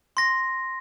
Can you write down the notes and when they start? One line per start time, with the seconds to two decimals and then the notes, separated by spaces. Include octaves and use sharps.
0.17 C6 A#6